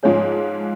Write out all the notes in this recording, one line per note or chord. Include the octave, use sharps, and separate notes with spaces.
G#2 F3 G#3 F4 G#4 C#5